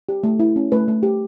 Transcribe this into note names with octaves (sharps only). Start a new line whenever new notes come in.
G4
A3
E4
C#4
A3 B4
A3
G4